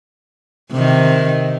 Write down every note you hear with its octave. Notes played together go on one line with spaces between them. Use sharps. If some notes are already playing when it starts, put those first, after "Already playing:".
C3 D#3